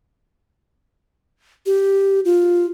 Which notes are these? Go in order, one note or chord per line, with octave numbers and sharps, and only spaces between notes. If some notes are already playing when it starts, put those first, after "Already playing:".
G4
F4